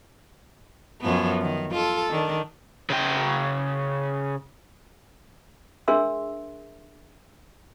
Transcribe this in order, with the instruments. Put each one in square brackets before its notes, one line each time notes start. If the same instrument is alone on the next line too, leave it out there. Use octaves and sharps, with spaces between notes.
[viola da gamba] F#2 F3 B3
D#3
F4 A4
D#3 D4
[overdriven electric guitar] C#3 G5
[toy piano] D4 G#4 A#4 E5 C6 E6